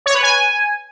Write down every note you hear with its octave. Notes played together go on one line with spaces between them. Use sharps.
C#5
B4
G#5